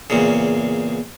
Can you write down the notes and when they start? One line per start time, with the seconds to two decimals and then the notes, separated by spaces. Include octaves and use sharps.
0.10 E2 A#2 C#3